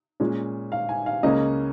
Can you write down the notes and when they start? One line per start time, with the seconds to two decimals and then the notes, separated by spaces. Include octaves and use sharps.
0.20 A#2 G#3 C#4
0.72 F5
0.89 G#5
1.06 F5
1.23 C#2 C#3 A#3 C#4 D#5